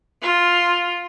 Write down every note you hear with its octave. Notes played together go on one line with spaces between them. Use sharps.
F4